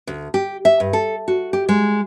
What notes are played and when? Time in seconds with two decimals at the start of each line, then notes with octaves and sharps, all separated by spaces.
0.07 D2
0.34 G4
0.65 E5
0.80 G2
0.93 A4
1.28 F#4
1.53 G4
1.69 G#3